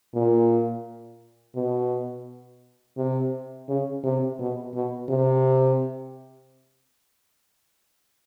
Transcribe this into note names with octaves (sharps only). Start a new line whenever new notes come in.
A#2
B2
C3
C#3
C3
B2
B2
C3